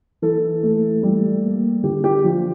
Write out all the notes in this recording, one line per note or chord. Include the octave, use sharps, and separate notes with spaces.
E3 A4
A3
G3
A#3
D3 G4
G4
F3